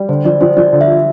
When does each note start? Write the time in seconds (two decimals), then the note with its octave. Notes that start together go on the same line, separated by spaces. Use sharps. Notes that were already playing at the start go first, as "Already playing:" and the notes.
Already playing: G3
0.09 D3 C5
0.25 F3 D5
0.41 F3 C5
0.57 F3 D5
0.73 D3
0.81 E5